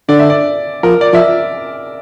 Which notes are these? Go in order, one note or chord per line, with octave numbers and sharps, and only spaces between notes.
D3 D5
E5
D5
F3 A#4
D5
F3 E5